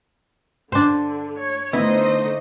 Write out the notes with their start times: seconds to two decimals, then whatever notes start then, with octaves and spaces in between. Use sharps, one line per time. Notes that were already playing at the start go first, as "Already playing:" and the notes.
0.72 G2 D3 D4 C5
1.38 C#5
1.73 D3 A3 B3 D#4 E4 C5 D#5